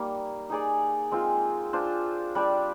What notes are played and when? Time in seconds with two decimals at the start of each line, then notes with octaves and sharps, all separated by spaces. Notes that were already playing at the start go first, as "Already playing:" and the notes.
Already playing: G3 A#3 D#4
0.50 D#4 G#4 D5
1.11 G#3 C4 F4
1.73 D4 F4 C5
2.35 G3 D4 G4 D5